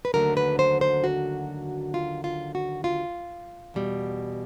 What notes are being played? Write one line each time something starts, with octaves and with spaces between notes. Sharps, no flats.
B4
D#2 D3 F#3 A3 A#4
B4
C5
C5
F#4
F4
F4
F#4
F4
E2 B2 G3